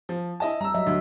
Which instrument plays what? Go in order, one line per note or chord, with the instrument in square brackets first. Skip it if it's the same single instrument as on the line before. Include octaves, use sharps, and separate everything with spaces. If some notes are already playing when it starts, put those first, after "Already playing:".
[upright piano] F3
E4 D#5 A5
[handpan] G3 [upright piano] A#5 E6
[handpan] F#3 D#5 E5
[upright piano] D2